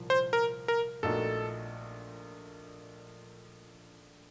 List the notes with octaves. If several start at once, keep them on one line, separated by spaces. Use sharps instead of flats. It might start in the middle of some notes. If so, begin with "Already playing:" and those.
Already playing: C2 A#2 F3
C5
A#4
A#4
A#1 A#2 A3 D#4 F#4 A4